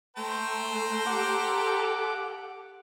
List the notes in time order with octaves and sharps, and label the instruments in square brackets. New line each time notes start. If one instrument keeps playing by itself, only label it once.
[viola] A3 [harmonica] C5 G5 A#5
[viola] G4 A4 [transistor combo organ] F#5 D6